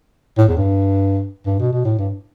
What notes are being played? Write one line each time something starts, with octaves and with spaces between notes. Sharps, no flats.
A2
E2
G2
G2
B2
B2
A2
G2